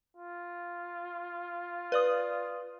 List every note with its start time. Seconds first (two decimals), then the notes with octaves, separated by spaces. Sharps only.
0.17 F4
1.92 B4 D5 D#6